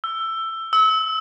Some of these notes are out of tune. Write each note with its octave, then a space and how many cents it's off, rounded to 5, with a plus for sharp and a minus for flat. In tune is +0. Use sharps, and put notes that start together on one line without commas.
E6 +15
E6 -30